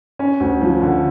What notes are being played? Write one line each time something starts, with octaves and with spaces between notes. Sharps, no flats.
C#4
D2
F3
D3